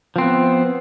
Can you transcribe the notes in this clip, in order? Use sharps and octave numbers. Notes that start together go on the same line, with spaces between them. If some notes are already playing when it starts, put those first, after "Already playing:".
F3 B3 C4